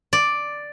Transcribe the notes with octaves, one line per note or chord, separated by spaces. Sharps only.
D5